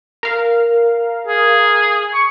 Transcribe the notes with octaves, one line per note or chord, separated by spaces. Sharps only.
A#4 F5
G#4
C#6